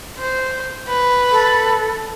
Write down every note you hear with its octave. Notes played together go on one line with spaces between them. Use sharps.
C5
B4
A4